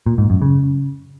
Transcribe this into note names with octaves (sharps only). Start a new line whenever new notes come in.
A#2
G#2
F#2
C#3